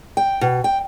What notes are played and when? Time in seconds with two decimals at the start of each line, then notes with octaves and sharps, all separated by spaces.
0.17 G5
0.41 B2
0.64 G5